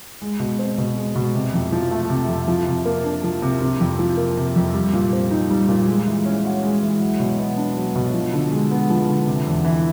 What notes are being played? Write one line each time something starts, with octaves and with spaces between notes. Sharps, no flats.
G#3
B2
C4
B2
G#3
B2
C3
F2
F3
A3
C3
F2
F3
C3
A#3
D4
F3
C3
C3
F2
F3
A#3
C3
F2
G3
A#2
C4
D#4
G3
A#2
G#3
E3
C#4
F#4
G#3
E3
F#3
B2
B3
D4
F#3
B2
F3
D3
G#3
B3
F3
D3
C3
E2
E3